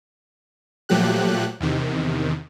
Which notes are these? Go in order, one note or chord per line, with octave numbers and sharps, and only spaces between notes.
A#2 F3 F#3 A3 G4 F#6
E2 C3 D#3